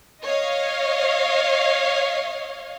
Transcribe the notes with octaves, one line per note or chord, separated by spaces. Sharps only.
C#5 D#5 F5